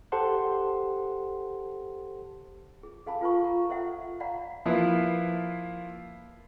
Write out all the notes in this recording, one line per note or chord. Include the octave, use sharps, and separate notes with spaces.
G4 A4 C5 F#5 A5 C6
G#4
G#4 A4 F5 G#5 A5 B5
F4 A4 B4 G#5 B5 C#6
A#5
A4 C5 E5 F#5
D5 F5 F#5 A#5 B5
F3 A#3 E4 F4 B4